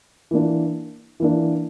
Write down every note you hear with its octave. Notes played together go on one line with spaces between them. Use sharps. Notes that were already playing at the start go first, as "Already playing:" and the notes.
E3 A#3 D4
E3 A#3 D4